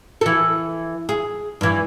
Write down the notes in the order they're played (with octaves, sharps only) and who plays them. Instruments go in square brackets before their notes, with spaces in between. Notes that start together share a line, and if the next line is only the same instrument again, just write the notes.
[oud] E3 A4
G#4
G2 E3